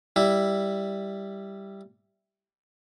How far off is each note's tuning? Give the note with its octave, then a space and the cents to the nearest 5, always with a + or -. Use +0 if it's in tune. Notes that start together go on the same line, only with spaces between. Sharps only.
G3 +0 E4 +0